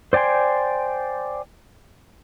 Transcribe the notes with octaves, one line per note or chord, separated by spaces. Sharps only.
C5 D5 G5 G#5 C6